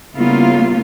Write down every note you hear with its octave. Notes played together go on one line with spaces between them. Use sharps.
C#3 G3 A#3 B3 E4 F4